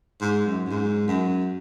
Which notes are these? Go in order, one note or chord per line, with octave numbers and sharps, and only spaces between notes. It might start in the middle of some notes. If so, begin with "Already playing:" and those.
G#2
F#2
F#2
G#2
F#2